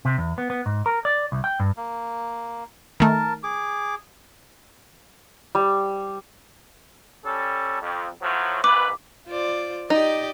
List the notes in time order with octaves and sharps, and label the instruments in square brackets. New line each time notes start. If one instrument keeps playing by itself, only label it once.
[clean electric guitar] C3
E2
B3
B3
G#2
A#4
D5
C2
G5
G2
[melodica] A#3
[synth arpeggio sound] D#3 A3 [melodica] A#4 A5
[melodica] G#4 D6
[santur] G3
[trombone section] G3 C#4 A4
F2
A2 F3 F#3
[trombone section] A#1 G#2 B4 [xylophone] D6
[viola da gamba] F4 C5 D5
[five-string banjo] D#4 [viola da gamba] G4 D5 D#5